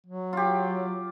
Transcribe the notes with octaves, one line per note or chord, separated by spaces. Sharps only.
F#3
F4 G4